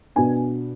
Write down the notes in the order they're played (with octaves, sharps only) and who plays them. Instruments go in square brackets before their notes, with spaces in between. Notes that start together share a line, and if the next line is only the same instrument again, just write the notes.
[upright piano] B2 B3 D4 G#5